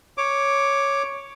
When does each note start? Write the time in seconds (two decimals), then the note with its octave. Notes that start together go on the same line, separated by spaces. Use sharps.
0.18 C#5 D6